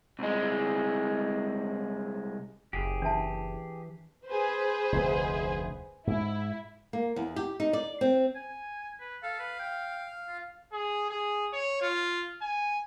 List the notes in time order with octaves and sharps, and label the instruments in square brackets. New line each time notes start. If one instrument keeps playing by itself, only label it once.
[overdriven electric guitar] C2 G#3
[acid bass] F#1 [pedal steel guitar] G4 G#4
[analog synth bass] E3 [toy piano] D4 E5 A5
[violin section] G#4 B4 C5
[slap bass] F1 D2 A3
[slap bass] G#2 [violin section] E4
[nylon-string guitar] A#3
E2
G4
D#4
D5
C4
[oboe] G#5
B4
[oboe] A4 [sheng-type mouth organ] F5
[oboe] B4
G5
F4
[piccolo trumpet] G#4
G#4
C#5
F4
G#5